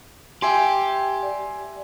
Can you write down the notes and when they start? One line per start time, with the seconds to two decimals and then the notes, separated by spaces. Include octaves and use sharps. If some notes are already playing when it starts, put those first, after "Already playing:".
0.42 G4 E5 G#5 C6
1.23 D5